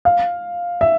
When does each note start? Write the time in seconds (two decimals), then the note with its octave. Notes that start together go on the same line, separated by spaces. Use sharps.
0.05 F5
0.81 E5